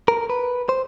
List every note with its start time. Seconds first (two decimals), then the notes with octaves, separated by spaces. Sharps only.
0.08 A#4
0.30 B4
0.69 C5